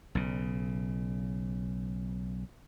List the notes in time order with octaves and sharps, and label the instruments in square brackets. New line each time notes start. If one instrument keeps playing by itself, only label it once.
[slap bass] B1 C#3